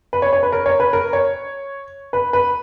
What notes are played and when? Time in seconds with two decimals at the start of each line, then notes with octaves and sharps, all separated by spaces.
0.13 B4
0.22 C#5
0.33 C#5
0.43 B4
0.52 A#4
0.66 C#5
0.80 B4
0.93 A#4
1.13 C#5
2.13 B4
2.33 B4